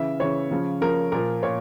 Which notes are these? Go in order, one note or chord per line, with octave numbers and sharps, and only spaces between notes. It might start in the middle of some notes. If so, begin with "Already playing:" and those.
Already playing: C#3 E3 E5
C#3 E3 C#5
C#3 F3
C#3 F3 A#4
A#2 F3 A#4
A#2 C#5